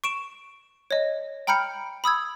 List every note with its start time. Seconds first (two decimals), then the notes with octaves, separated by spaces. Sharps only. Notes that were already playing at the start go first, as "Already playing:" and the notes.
0.04 C#6 D7 E7
0.91 C#5 D#5
1.47 G5 A#5 B5 F6 G6 C#7
2.04 B5 D#6 E6 G#6